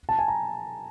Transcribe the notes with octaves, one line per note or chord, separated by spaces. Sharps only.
A5
G#5
A#5